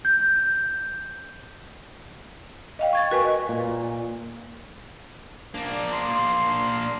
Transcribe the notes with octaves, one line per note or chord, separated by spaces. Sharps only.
G6
D#5 F5 G5
C#6 G#6 A6
F#4 A#4 B4 G#5 C#6
D#5
A#2
A#3 D4
C6